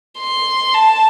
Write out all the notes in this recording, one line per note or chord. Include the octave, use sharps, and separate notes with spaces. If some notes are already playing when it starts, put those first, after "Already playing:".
C6
A5